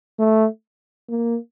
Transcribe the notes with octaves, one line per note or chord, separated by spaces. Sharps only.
A3
A#3